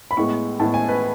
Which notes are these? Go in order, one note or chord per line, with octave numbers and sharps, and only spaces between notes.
B5
A2 G#3 B3 C#6
A2 G#3 B3 A5
G#5
B4